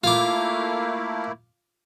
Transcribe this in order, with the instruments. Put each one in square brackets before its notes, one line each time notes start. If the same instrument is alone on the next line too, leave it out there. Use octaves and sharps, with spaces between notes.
[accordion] A3 A#3 E4 [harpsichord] F4 D6